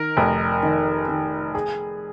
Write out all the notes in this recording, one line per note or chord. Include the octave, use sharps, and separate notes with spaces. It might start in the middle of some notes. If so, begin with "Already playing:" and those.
Already playing: D#3 A#4
F1
D#3
D#3
G#4